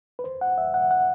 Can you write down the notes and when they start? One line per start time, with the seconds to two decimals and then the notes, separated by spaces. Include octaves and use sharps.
0.19 B4
0.24 C5
0.41 F#5
0.58 E5
0.74 F#5
0.91 F#5